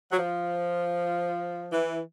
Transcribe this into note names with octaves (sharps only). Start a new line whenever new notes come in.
F#3
F3
E3